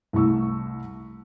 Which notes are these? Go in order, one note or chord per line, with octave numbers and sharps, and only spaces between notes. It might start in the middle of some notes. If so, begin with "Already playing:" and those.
C2 A3 C#6 E6